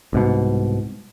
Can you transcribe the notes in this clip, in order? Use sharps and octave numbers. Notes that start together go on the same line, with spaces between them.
C2 G#2 B2